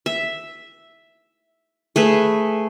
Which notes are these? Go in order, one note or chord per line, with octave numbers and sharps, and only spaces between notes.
E5
A3 G#4 B4 E5